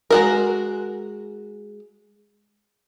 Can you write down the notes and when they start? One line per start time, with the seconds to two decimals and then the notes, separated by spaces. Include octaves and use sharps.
0.10 G#3 F#4 A#4